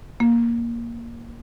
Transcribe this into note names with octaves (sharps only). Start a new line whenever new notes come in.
A#3